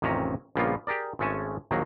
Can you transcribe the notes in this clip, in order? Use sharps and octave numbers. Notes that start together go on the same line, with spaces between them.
A1 F2 C3 D#3 C#4 A#5
A#1 C#3 G3 A#3 B3 F4
G4 G#4 A#4 D5
G#1 G#3 A3 C#4 G#5 A5
A#1 D#2 D#3 F#3 A#3